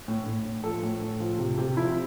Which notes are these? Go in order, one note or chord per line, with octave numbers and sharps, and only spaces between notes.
A2
A2
A2
F3 A4
A2
A2
F3
C3
C3
F3 E4